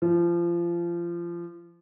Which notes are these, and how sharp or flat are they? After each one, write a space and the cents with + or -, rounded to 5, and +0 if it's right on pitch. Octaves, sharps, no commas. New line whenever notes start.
F3 -25